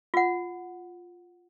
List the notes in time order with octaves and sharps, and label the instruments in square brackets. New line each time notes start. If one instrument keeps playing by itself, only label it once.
[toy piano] F4 F#5